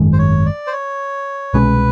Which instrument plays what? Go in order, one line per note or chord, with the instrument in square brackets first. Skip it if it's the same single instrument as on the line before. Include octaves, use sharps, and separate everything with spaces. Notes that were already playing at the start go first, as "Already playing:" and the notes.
Already playing: [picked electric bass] G#1 F#2 D#3 G#3
[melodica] C5
C#5
D5
C5
C#5
[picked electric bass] C2 B2 G#3 C#4 [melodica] B4